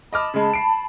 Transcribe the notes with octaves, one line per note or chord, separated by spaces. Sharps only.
D#5 A5 B5 D6 F6
C#3 G#3
C7 D7